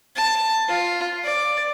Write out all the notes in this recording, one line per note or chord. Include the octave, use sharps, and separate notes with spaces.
A5
F4
D5